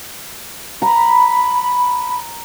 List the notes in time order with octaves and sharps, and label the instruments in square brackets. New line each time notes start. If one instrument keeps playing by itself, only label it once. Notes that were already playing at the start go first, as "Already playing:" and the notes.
[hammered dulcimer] A#5 [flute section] B5